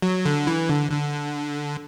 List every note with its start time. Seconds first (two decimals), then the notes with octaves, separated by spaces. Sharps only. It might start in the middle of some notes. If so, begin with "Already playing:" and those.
0.02 F#3
0.25 D3
0.47 E3
0.70 D3
0.92 D3